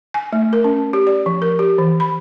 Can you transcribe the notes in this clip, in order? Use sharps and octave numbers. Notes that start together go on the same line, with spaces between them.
G#5
A3
A#4
C#4
G4
D5
F3
A#4
G4
E3
B5